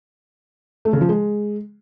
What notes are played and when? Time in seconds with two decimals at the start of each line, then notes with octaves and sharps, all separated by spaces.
0.85 A3
0.93 C#3
1.01 F3
1.09 G#3